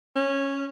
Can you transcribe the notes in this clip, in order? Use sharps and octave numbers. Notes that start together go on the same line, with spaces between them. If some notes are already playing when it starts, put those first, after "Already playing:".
C#4